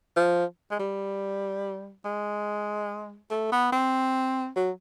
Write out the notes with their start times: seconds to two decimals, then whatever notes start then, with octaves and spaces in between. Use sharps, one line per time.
0.17 F3
0.71 G#3
0.80 G3
2.05 G#3
3.31 A3
3.52 B3
3.72 C4
4.56 F#3